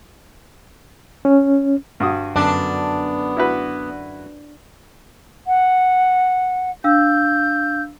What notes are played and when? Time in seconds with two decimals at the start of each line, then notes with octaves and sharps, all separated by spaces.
1.25 C#4
2.00 G2 F#4 D#6
2.36 F#2 D3 B3 D4
3.37 E4 F#4 B4
5.45 F#5
6.84 D4 F5 E6 G6